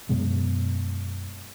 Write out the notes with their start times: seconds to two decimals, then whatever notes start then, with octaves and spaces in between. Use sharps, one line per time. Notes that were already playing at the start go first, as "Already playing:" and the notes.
0.09 F#2 B2 G#3